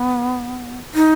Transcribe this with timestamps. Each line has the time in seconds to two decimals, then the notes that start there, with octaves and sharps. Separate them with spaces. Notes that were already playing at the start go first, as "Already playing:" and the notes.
Already playing: B3
0.95 D#4